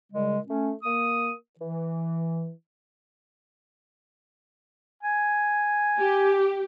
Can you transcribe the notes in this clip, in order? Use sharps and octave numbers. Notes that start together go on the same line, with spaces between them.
A#2 C#3 G3 G#3
A3 C#4
A#3 D#6
E3
G#5
G4